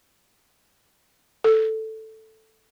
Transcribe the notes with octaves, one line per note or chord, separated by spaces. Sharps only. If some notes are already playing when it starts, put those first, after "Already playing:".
A4